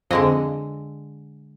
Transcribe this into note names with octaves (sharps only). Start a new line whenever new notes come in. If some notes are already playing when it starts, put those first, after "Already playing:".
F2 D3 G#3 D#5